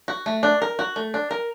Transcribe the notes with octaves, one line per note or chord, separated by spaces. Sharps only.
F#4
A3
D4
A#4
F#4
A3
D4
A#4